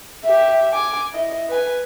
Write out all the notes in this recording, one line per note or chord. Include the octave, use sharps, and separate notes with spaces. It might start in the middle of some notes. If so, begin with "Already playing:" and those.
G4 E5
G#5 D6
E4 D#5
B4 G#5